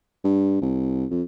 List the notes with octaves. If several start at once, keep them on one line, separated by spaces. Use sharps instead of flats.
G2
C2
F2